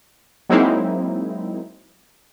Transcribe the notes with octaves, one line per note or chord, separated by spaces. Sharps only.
F#3 G#3 A#3 C4 D#4 E4